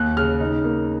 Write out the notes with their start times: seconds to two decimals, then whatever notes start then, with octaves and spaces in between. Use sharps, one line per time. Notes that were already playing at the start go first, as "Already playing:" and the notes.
Already playing: D#2 F#6
0.17 C#3 F6
0.41 D#4
0.64 A#3